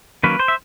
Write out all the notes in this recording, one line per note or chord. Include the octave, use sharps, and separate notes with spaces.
D#3 F#3 A#3 C#4 B4
C5
E5